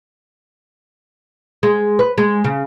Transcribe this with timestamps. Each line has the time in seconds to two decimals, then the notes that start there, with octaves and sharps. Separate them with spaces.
1.63 G#3
1.99 B4
2.18 G#3
2.44 C#3